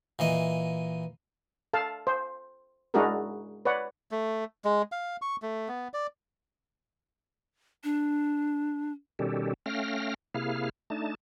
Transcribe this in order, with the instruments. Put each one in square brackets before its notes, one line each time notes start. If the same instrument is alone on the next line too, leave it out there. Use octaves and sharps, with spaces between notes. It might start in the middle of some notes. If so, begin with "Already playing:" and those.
[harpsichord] A#2 E3 D#5
[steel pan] A4 F5 A5
C5
G#3 D4 E4 F#4 G#4 A#4
B4 C#5 D5 F#5
[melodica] A3
G#3
F5
C#6
A3
B3
D5
[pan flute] D4
[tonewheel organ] B2 D#3 G3 C#4 G4 A4
A3 C#4 F5 G5 F6 A#6
C3 A#3 E4 G#4 F5 F6
A3 D4 D#4 A5